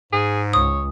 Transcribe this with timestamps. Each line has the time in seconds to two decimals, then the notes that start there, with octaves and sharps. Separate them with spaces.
0.13 G#2 G#4
0.53 C#2 C#5 D#6